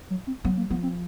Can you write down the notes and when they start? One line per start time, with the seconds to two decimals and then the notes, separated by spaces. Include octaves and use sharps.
0.10 F#3
0.27 C4
0.44 F#3 B3
0.57 A#3
0.70 F3 B3
0.83 C4